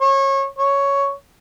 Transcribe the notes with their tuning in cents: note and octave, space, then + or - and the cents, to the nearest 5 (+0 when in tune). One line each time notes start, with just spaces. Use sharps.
C#5 -25
C#5 +5